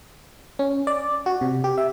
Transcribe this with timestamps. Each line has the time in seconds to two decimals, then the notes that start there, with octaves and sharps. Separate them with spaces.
0.59 C#4
0.87 D5
1.26 F#4
1.41 C3
1.64 G4
1.78 E5